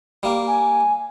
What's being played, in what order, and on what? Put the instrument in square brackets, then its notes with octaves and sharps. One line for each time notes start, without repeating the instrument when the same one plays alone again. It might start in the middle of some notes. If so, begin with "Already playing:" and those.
[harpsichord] G3 A#3
[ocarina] G#5